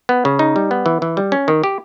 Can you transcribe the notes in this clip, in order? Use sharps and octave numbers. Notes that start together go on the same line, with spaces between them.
B3
C#3
D#4
G3
B3
E3
E3
G3
C#4
D#3
G4